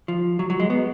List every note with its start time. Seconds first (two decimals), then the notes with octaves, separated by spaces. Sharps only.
0.08 F3
0.39 F#3
0.50 F#3
0.60 G#3
0.70 B3